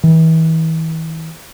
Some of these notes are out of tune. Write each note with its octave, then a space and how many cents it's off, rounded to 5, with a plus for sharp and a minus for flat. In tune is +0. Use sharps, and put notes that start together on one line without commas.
E3 -40